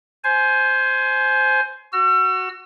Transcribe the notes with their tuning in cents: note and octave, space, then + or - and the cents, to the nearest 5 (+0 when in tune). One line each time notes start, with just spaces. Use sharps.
C5 +0 G#5 +25
F#4 +0 E6 +40